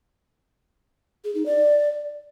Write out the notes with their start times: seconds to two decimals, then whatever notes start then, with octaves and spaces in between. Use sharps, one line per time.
1.24 G#4
1.35 D#4
1.46 D5